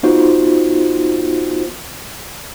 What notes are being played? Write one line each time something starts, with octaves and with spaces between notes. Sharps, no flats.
B3 D#4 F4 F#4 C5